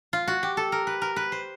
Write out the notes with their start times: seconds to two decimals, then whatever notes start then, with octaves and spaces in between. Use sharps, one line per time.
0.13 F4
0.28 F#4
0.43 G4
0.57 A4
0.72 A#4
0.87 B4
1.02 A#4
1.16 B4
1.32 C5